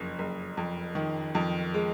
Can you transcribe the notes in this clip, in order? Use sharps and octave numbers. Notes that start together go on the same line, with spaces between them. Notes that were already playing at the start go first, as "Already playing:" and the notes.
Already playing: F#1 F2
F#1
F2
D#3
F2
G#3